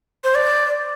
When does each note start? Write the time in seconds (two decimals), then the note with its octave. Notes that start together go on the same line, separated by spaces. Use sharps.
0.24 C5
0.35 D5